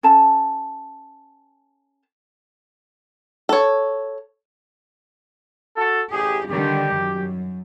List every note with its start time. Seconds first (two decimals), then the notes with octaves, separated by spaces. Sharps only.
0.03 C#4 A4 F5 A5
3.49 A4 C#5
5.77 F#4 A4
6.12 A1 G4 G#4
6.50 D3 D#3 G3 G4
6.95 F#2